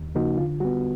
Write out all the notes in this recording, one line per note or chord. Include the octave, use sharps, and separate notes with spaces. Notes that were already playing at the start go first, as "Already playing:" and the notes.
Already playing: D#2
C#3 F3 A#3 D#4 F#4
D3 F4
G3 B3 F#4